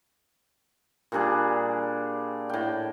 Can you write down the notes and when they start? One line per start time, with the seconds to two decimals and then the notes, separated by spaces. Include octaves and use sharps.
1.12 A#2 G3 D4 G#4
2.49 A2 G5